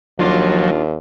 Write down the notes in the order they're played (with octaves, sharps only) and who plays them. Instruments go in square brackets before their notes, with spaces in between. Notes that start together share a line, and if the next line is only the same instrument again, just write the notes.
[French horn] D#2 [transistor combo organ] F3 F#3 [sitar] D4 F4